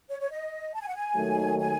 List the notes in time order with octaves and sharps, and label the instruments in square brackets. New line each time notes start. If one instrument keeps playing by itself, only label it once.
[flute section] C#5
C#5
D#5
A5
G#5
F#5
G#5
[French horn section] D#2 D#3 F#3 A3
[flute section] G#5